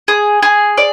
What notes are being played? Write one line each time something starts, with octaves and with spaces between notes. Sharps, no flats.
G#4
G#4
D5